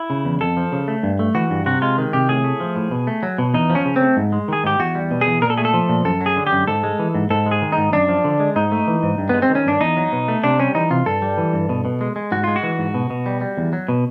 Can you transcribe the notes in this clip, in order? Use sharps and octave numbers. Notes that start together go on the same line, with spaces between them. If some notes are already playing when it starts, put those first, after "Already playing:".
Already playing: E4
C#3
E2
F2 A4
F3
C#3
A3
G2
A3
E3 F#4
G2
C3 F#4
G#3 F4
D#3
C3 G4
A2 G#4
A3
F3
A2
B2
A3
F#3
B2
E2 D#4
F3
C#4
C#3
C4
A3
G#2
G#3
D#3 G#4
G#2 G4
E2 F#4
G3
B2
G#4
E2
A#2 A#4
A4
A3 G#4
A4
F3
A#2
F#2 A4
F#3
G#4
D3
G4
F#2
G#2 A4
G#3
E3
G#2
G#2 A4
G#3
G#4
D#3
D#4
G#2
F#2 D4
F3
D3
G#3
G#2 D#4
A3
E3
G#2
G2
G#3 B3
C4
D#3
C#4
G2 D4
E2 D#4
F#3
B2
A3
C3 D4
G3 C#4
E3 D#4
C3 F4
G2 A4
G3
E3
G2
B2
B2
G#3
G#3
G#2 F#4
G#3 F4
F#4
E3
G#2
B2
B2
G3
G3
E2
F#3
B2